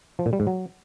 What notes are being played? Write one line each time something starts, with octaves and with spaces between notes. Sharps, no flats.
F3
A#2
G3
G#2
F#3